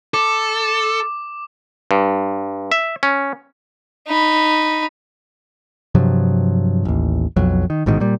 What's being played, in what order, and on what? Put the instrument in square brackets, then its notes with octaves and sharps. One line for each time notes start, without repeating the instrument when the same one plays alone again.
[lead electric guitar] A4 [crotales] D6
[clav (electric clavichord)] G2
E5
C#4
[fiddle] D#4 B5
[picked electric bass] G2 C3 F3 F#3
A1 D#2
B1 F2 F#3
D#3
A1 G#2 B2 D#3
A#2 G3